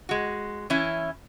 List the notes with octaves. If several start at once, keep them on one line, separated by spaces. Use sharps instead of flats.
G#3 F#4
E3 C#4 E4